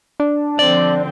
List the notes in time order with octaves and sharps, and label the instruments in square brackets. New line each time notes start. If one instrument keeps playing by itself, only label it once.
[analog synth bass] D4
[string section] D3 F3 C4 [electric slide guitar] D5